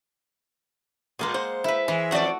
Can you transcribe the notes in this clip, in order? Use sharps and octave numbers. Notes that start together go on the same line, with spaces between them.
A#2 G#3 A#3 G#4
C5 F#5
E4 B4 E5
E3 G#3
F2 A3 D4 F#4 D5 F#5